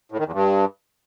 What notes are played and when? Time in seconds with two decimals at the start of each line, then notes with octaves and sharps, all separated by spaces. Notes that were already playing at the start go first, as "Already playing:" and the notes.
0.12 A2
0.19 D#3
0.26 E2
0.32 G2